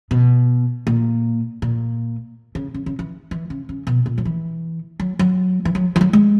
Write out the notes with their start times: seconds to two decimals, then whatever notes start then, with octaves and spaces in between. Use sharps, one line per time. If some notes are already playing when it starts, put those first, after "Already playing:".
0.11 B2
0.87 A#2
1.62 A#2
2.55 C#3
2.74 C#3
2.86 C#3
2.99 E3
3.31 E3
3.50 C#3
3.69 C#3
3.87 B2
4.06 A#2
4.18 F#3
4.25 E3
5.00 F#3
5.19 F#3
5.65 E3
5.75 F#3
5.96 E3
6.01 F#3
6.13 G#3